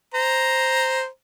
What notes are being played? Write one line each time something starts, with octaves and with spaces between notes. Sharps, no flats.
C5 A#5